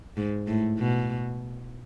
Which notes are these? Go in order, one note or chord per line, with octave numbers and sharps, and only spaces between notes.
G#2
A2
B2